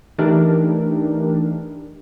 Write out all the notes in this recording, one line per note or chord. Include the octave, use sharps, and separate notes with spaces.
E3 A3 D4 D#4 G4 A#4